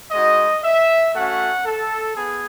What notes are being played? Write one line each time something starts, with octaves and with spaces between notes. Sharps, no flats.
G#3 D#4 F#4 D#5
E5
A3 C#4 F#4 F#5
A4
B3 G#4